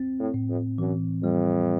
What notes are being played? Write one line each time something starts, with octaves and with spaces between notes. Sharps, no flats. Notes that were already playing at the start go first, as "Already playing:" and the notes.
Already playing: C4
A2
A2
F2
F#2 E3
F2 G3